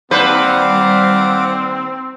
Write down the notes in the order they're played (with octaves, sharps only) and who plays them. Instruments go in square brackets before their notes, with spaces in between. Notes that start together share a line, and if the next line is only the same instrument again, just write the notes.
[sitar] D#2 B4 C5 [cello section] G3 [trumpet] C4 [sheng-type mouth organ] D5 F5 F#5